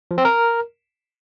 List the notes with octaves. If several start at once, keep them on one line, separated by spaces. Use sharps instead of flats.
F3
C4
A#4